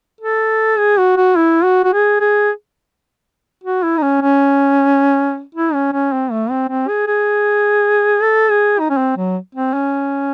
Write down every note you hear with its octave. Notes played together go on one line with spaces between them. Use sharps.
A4
G#4
F#4
F#4
E4
F#4
F#4
G#4
G#4
F#4
E4
D#4
C#4
C#4
E4
C#4
C#4
C4
A3
C4
C4
G#4
G#4
A4
G#4
D#4
C#4
C4
F#3
C4
C#4